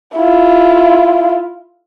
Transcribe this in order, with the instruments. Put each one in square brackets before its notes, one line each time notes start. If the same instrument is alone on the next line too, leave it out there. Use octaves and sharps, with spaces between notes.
[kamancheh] E4 F4